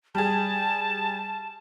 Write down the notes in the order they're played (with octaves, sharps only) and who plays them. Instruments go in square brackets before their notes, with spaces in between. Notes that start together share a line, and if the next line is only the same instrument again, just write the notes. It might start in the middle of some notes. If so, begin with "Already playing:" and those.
[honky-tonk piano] G3 G#4 [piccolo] A5